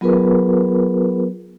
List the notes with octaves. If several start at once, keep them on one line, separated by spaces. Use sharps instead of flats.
F#3 B3 F4 G#4 A#4 B4